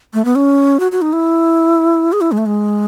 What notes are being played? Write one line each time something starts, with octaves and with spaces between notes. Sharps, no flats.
A3
B3
C#4
F#4
F#4
D#4
E4
G#4
E4
G#3
A3
G#3